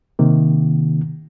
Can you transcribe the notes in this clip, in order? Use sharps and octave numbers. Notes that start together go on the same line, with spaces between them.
C3 D#3 A#3